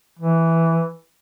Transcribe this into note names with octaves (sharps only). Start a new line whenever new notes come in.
E3